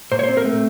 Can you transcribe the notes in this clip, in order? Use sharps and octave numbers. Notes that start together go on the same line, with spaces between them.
A#2 C5
C#5
C4 C5
A#4
A3